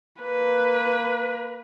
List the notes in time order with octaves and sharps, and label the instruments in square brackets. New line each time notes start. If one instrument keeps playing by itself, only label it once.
[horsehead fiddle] A#3 B4